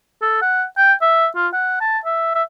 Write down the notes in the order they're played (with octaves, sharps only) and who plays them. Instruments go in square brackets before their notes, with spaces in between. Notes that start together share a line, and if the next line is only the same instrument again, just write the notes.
[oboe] A4
F#5
G5
E5
F4
F#5
A5
E5
E5